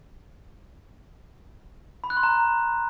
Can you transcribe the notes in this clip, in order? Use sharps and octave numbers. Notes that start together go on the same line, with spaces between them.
B5
F#6
C6
A#5